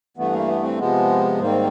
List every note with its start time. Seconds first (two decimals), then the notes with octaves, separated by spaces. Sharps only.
0.17 G2 E3 A3 B3
0.33 A#3
0.47 B3
0.63 C4
0.78 C3 F3 G#3 B3
1.40 G#2 D#3 G3 A#3 C4